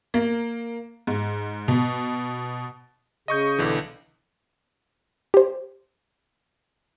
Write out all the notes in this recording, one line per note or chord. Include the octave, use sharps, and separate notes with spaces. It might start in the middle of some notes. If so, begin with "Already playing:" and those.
A#3
G#2
B2
C#3 D#5 C#6 G6
B1 D3 E3
G4 C5